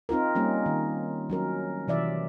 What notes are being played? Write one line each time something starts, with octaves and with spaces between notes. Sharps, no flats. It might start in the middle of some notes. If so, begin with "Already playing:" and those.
C4 D#4 F4 A#4
G3 A#3 C#4
D#3
F#3 C#4 A#4
C3 E3 D5 E5